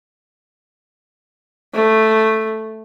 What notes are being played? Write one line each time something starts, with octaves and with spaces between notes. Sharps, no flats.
A3